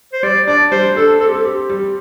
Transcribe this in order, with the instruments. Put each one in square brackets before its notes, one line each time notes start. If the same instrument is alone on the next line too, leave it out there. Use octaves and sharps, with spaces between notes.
[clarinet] C5
[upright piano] G3 [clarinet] D5
[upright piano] D4 [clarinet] D5
[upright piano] G3 [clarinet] C5
[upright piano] D4 [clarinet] A4
[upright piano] C4 [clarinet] A4
[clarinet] G4
A4
[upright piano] C4 [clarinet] G4
[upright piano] G3